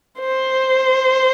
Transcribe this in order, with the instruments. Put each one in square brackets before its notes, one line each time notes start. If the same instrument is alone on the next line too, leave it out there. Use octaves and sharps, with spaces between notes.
[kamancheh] C5